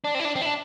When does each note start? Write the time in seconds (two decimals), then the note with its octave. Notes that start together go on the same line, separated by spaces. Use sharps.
0.04 D4
0.15 C4
0.19 E4
0.25 D4
0.36 C4
0.41 E4
0.46 D4